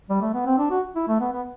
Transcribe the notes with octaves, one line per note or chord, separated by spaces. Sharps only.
G3
A3
B3
C4
D4
F#4
E4
A3
B3
B3